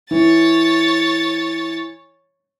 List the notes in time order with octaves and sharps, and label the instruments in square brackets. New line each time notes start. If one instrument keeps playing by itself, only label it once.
[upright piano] E3 [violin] C#5 A6